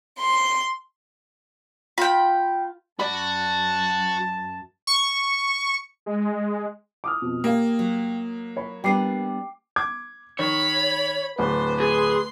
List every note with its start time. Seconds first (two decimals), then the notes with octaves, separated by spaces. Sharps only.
0.19 C6
1.98 F4 G5 B5
2.99 F#2 F#4 D5 A5 B5
4.87 C#6
6.06 G#3
7.04 D6 D#6 F6
7.22 F2 B2
7.44 A#3 G4 F5
7.79 F#3
8.57 C#5 B5
8.84 G3 B3 D4 G5 D6 C7
9.76 D6 G#6
10.39 D#3 C#5 B5
11.39 D1 B4 C5
11.80 G#4 C6